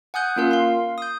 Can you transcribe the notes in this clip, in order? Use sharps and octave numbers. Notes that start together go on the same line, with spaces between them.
F#5 G#5 D#6 F#6 G6
A#3 C#4 F4 A#4 F5
F5 C6
D#6 G6